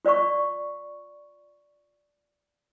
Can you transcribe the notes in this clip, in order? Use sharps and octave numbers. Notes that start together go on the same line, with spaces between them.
F4 D5 F5 B5 C#6